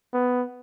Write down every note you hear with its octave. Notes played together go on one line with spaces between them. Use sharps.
B3